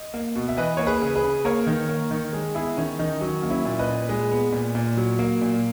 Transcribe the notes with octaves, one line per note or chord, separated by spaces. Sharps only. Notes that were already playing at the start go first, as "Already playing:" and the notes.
Already playing: D#5
A#3
B2
E5
E3 B4 D#5
A#3 C#5
G#4 B4
C#3
G#4 B4
C#3
A#3 A#4 C#5
D#3
A#3
D#3
G#3
B3 E4 G#4
D#3 C#4
D#3 D#4
F#3 C#4
A#3
C#4 E4
A#2
B4 D#5
A#2
G#3
B3
A#2
A#2
F#3
A#3
A#2